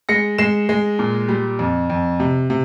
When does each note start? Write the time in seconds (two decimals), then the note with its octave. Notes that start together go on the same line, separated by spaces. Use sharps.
0.09 G#3 A#6 C#7
0.38 G#3 C7 E7
0.69 G#3
0.99 A#2
1.29 G3
1.59 F2
1.90 F2
2.20 C3
2.50 C3